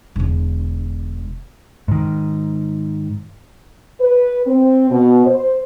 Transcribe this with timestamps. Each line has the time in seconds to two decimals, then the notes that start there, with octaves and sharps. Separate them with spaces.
0.16 E1 D3
1.88 G#2 D#3
4.00 B4
4.47 C4
4.90 B2
5.26 C5